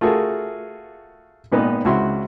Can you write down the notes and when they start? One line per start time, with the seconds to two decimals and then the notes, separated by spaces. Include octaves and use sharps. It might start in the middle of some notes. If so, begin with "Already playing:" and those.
0.01 A3 F4 F#4 G#4 A#4
1.52 G#1 A#2 B3 D#4 B4
1.85 C#2 C4 E4 F#4 E5 C6